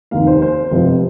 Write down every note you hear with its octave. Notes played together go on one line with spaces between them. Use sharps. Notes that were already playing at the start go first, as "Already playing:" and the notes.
F1 D#2 D#3 A#3 F5
C5
C5
F1 F2 C3 F3